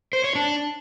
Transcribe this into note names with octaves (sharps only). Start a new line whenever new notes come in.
C5
C#5
D4